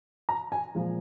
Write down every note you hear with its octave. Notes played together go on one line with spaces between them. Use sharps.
A#5
G#5
A#2 F3 G#3